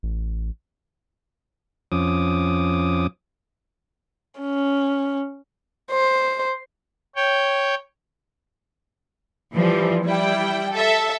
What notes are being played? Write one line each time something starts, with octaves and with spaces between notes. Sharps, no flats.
A1
F2 F3 C#4 D6 D#6
C#4
C5
C#5 G5
E3 F3 G3
G3 E4 G5
A4 E5